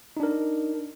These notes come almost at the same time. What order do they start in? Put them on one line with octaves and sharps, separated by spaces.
D#4 D4 A#4